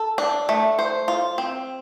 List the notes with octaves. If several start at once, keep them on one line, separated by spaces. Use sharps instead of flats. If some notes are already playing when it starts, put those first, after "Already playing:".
Already playing: A4
D4
A3
C5
F4
C4